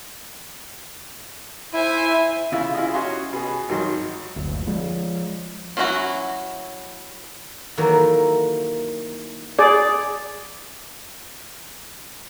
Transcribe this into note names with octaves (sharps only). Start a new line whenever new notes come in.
E4 C5 E5 G#5
C#3 E4 F4
E4 F4 G#4 D#5
C#4 F#4 D#5 C6
B2 G#4
G#1 D#3 F#3 C6
F#1 D2
F3 G#3
F#3 C#4 D4 E4 F#4
D#3 E3 F#3 A#3 F#4 A4
G#4 D5